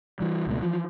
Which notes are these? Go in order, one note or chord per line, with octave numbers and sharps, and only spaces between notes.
E3 G3
C#2 B2 A3
E3 F3